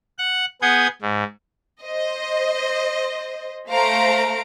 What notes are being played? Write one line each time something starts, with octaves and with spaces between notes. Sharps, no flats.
F#5 F#6
B3 G#4 F#5 G6 G#6
G#2
C5 D#5
A3 C5 F5 A#5 D7